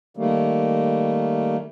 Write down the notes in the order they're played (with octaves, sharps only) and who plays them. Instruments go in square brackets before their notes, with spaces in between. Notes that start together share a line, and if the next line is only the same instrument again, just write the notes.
[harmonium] D#3 G3 A3 A#3